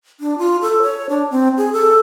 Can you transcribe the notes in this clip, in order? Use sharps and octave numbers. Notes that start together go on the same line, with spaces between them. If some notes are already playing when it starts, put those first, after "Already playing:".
D4
F4
A4
C#5
D4
C4
G#4
A4